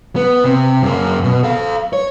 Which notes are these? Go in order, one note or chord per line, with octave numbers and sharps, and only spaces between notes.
B3
C3
F#2 A#3
B2
A4 F5
C#5